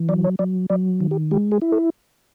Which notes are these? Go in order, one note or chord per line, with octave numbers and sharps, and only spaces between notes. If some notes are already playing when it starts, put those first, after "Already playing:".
Already playing: E3
F#3 D5
C#5
F#3 D5
F#3 D5
D#3
G4
G#3 G4
G#4
E4
A4